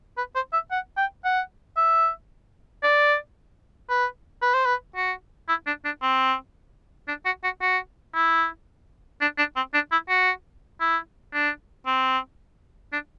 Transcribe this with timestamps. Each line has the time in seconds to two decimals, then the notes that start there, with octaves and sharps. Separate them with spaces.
0.18 B4
0.35 C5
0.53 E5
0.71 F#5
0.97 G5
1.24 F#5
1.77 E5
2.83 D5
3.90 B4
4.42 B4
4.54 C5
4.66 B4
4.96 F#4
5.49 E4
5.67 D4
5.85 D4
6.02 C4
7.08 D4
7.26 F#4
7.44 F#4
7.62 F#4
8.15 E4
9.21 D4
9.38 D4
9.56 C4
9.74 D4
9.92 E4
10.09 F#4
10.81 E4
11.34 D4
11.86 C4
12.93 D4